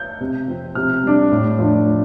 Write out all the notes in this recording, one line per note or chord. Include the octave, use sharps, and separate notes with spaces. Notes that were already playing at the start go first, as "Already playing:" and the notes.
Already playing: G6
C3
F3 C4
C3 F6
G3 D4
A2
F3 A3 D4